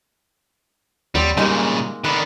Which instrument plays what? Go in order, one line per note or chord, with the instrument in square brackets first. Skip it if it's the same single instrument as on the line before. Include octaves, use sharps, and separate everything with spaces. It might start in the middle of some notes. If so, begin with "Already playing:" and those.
[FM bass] D#2 [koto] F#3 C4 [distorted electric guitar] G3
[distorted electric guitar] A#2 C#3 [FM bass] G3 [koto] G#3 A#3 D#4
[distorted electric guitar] D3 D#3 [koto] B4 A5